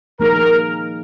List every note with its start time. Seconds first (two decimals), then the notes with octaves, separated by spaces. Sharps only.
0.20 F3 A#3 D#4 G#4 A#4